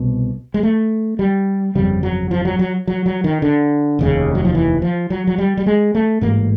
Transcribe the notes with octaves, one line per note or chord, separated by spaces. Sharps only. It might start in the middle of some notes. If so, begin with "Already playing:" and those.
Already playing: C2 B2
G#3
A3
G3
G1 F2 C#3 G3
F#3
F3
F#3
F#3
F#3
F#3
D#3
D3
F1 D#2 C#3
F#3
F3
E3
F3
F#3
F#3
G3
G3
G#3
A3
A1 G#2 A#3